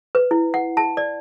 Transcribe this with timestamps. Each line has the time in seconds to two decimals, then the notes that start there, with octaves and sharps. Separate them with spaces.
0.15 B4
0.31 E4
0.54 F#5
0.77 A5
0.97 D5